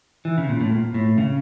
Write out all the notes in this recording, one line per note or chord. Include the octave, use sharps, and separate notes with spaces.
E3
C#3
A#2
A2
A#2
A2
C#3